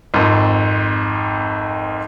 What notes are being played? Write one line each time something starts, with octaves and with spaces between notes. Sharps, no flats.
G#1 F2